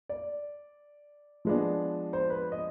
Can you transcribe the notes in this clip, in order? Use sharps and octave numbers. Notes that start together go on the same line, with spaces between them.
D5
F3 G#3 B3 D4
C5
B4
D#5